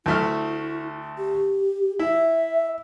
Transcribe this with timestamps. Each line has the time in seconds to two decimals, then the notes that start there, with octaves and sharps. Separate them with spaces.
0.06 D2 A3 E4 F6
1.18 G4
1.99 E4 E5